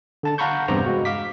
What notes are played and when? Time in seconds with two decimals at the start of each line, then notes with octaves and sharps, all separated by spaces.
0.23 D3 A5 A6
0.38 F5 F#5 A#5 B5 C#6 G6
0.68 E2 G2 C3 G4 C5 A#5
0.86 G#3 F#4
1.05 F5 D6 B6